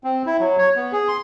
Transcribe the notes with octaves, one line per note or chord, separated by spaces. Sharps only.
C4
E4
F#3
C#5
B3
G#4
C6